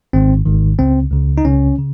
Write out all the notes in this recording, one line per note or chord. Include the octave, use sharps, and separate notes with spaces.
G#1 G#2 D#3 C4
G#1 G#2 D#3
C#2 C#3 C4
C#2 C#3
D#4
C#2 C#3 C#4
C#3